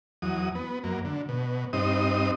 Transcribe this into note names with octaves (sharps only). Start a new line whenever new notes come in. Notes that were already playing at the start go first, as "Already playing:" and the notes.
E2 F#3 D#6
B3
F#2 A#3
D3
B2
G2 C4 D#4 D#6